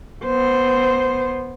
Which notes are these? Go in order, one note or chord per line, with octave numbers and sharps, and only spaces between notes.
B3 C5